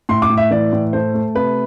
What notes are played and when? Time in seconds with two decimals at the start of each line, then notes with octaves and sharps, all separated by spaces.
0.09 A2 C6
0.22 D6
0.30 A2
0.37 E5
0.51 E3 D5
0.73 A2
0.93 A3 C5
1.14 A3
1.35 C3 B4